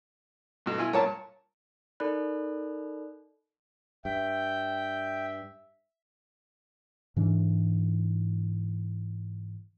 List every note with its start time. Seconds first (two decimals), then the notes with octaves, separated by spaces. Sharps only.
0.66 G2 B2 A3
0.78 E4 F4 G#5
0.93 G2 A#2 A#4 C#5 A5
2.00 D#4 A4 A#4 D5 B5 F#6
4.05 G2 E5 G5
7.16 G#2 E3 D4